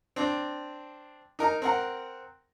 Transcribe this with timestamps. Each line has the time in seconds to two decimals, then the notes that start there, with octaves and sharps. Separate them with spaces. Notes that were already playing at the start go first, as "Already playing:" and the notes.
0.16 C4 D4
1.39 D#4 A#4
1.62 C4 A#4 F#5